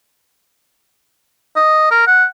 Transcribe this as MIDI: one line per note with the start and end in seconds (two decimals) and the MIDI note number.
1.56 1.88 75
1.91 2.03 70
2.07 2.25 78